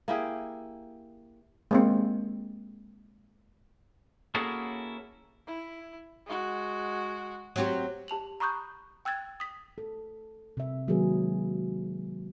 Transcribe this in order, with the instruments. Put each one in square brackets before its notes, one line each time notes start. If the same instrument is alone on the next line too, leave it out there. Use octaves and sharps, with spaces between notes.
[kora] A#3 E4 G4 G#4
[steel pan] G#3 A#3 C4
[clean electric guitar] A#3 C#4 E4 F#4 G#4 A4
[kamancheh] E4
G#3 F#4
[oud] F#3 C4 G4
[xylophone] G4 A5 F7 F#7
A#5 B5 C#6 D#6 F#6 G6
G5 E6 F#6 G#6 A6
D#6 B6
[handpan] A4
C3 E5
D#3 F#3 G#3 A#3 G#4 B4